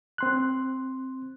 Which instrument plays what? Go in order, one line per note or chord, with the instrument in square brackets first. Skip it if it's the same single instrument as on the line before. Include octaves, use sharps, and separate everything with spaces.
[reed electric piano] C4 C6 F#6